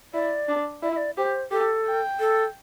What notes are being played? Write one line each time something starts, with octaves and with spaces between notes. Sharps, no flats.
E4 D5
D4
E4 D5
E5
D5
G4 C5
G4 A4
G5
A4